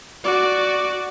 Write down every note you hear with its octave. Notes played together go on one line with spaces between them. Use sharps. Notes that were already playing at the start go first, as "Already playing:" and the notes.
F#4 D5